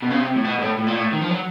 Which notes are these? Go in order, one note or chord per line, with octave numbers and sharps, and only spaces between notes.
B2
C#3
C3
A2
B2
G#2
A2
A2
A#2
A2
D#3
F3
F#3